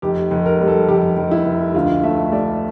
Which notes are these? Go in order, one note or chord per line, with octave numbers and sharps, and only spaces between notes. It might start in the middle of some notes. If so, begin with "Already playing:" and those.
F1 G4
F1
A#4
G3
A4
F1 G4
F1
E4
F1
D2 F4
A3 E5
A3 D5